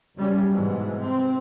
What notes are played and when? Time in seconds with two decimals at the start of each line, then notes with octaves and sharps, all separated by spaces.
0.16 F#1 G3 C#4
0.50 G#2 B2 E3
0.98 C3 C4